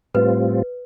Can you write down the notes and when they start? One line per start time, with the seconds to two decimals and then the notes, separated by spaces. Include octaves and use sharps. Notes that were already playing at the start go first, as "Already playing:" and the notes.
0.14 A2 G3 C4 F4 B4